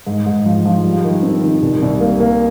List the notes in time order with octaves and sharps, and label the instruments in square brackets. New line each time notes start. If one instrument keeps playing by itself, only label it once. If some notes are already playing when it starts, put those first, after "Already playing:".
[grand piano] G#2
G#2
F3
F3
G3
D#3
C4
D#3
C2
C2
A#3
A#3